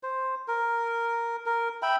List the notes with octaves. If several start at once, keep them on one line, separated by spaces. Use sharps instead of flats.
C5
A#4
A#4
E5 G5 B5